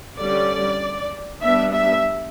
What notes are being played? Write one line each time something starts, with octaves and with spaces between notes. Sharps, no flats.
D3 G3 C#4 D5
G3 B3 D4 E5
E5